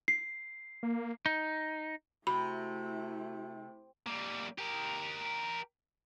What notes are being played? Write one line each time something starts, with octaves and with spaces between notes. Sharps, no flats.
C7
A#3
D#4
C3 A3 E4 F#4 B5
G3 A#3
G4 A#4